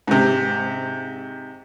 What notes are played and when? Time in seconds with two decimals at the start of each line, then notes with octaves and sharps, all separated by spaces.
0.07 G#2 C3